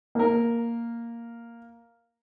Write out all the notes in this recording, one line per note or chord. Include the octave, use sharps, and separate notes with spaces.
A#3 A#4